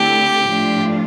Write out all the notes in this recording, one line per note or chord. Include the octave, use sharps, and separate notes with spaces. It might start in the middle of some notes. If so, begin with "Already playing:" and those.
Already playing: D3 A3 C4 E4 G4 A4
A2 F3 A3 D4 F4